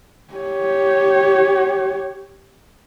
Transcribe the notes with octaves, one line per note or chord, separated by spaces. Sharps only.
G4 C#5